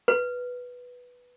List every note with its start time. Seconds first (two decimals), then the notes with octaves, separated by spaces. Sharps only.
0.08 B4